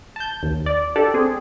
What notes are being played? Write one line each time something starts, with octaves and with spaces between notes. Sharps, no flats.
A5 G6
D#2
D5
D4 G4 A4 D5
C4 G#4